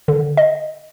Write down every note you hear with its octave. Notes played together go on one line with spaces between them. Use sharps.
D3
D#5